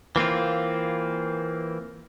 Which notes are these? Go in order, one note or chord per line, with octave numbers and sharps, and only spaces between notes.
E3 A#3 C4 F4